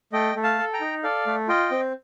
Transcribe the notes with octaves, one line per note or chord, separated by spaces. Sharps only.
A3 D#5 G5
A3
F5 A5
A4
G5 A#5
D#4
A4 D5 F5
A3
F4 D#5 G5
C4